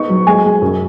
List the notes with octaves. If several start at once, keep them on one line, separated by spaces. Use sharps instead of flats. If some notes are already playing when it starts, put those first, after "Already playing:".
Already playing: B3 D#4 C#6
F#3
G#3 G#5
G#3
F#2